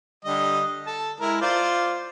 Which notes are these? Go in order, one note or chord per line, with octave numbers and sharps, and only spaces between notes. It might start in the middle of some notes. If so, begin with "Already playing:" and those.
D3 G3 D#5
A4 A5
G#3 E4 A#4
F4 C5 D5